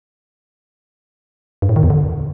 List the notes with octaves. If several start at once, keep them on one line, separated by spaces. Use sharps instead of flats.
G2
A2
D#3
E2
D3